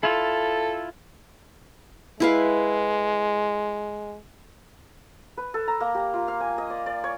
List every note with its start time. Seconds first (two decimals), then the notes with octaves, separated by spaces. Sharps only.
0.03 E4 F4 A4
2.20 G#3 E4 B4 F5
5.37 B4
5.54 A4
5.68 A#5
5.80 A#3
5.95 G4
6.14 F4
6.28 F5
6.40 G#5
6.58 D#5
6.70 D5
6.86 D5
7.04 C#5